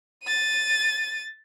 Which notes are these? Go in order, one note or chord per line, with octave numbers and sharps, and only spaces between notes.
A6 D#7